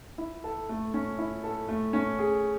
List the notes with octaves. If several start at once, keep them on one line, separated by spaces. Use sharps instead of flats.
E4
A4
A3
C#4
E4
A4
A3
C#4
G#4